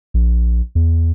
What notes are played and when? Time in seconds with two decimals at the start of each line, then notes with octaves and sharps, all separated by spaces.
0.14 A#1
0.75 E2